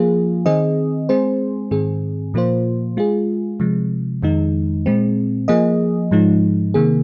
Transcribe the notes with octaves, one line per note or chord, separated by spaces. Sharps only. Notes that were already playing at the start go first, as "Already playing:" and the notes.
Already playing: F3 A#3 F4 G#4
D#3 C4 G#4 D#5
G#3 C4 G#4 C5
G#2 D#3 C4 G#4
A#2 F3 A#3 F4 C5
G#3 F4 G#4
C3 F3 G#3
F2 D#3 G#3 D#4
A#2 G#3 C4
F3 A#3 G#4 D#5
G#2 F3 G#3 D#4
C3 D#3 A#3 G#4